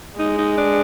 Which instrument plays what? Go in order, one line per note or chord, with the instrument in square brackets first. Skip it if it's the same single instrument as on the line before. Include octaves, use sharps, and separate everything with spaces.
[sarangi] G#3 [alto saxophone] D#4
[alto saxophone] D#4
D4